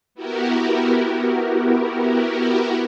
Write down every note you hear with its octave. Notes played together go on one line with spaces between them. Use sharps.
B3 E4 F#4 G4 A#4